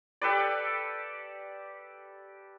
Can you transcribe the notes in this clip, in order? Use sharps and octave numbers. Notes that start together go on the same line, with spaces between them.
G4 A4 B4 D5